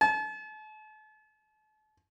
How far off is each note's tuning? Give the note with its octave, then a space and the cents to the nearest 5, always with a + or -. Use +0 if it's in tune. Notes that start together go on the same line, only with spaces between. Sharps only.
A5 -40